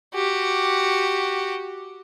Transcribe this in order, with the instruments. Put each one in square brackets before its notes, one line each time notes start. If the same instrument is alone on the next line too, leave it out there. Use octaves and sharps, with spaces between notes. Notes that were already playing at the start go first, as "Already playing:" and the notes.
[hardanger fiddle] F#4 G4